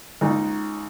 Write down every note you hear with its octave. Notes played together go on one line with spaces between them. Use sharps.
C#2 D#4